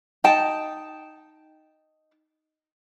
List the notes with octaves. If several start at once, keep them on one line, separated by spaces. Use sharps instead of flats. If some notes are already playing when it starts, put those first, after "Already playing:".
D#4 G5 A5